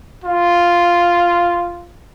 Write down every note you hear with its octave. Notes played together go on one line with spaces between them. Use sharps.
F4